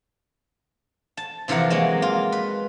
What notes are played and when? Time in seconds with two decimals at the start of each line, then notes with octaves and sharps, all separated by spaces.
1.17 A5
1.48 C3 E3 F3 A#4 F#5
1.70 F#3 G#3 A#3
2.02 F4
2.32 B4